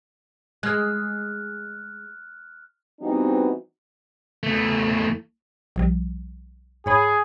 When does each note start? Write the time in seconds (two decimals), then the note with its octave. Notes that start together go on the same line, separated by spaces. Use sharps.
0.63 G#3 F6 F#6
3.01 E3 G3 B3 C4 D#4 F#4
4.43 E2 A3
5.76 B1 F3 G3
6.86 G#2 G#4 C#5 B5